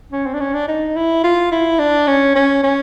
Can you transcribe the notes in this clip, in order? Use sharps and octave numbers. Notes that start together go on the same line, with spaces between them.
C#4
C4
D4
C#4
D4
D#4
E4
F4
E4
D4
C#4
C#4
C#4